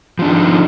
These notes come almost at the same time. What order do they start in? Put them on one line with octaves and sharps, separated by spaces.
F3 D4 D#4